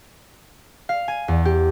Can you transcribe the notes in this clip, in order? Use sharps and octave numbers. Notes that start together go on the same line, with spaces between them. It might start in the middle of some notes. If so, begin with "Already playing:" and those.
F5
G#5
E2
G4